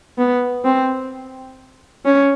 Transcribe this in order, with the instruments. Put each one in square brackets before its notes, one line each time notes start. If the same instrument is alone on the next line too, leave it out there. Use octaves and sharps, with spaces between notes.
[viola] B3
C4
C#4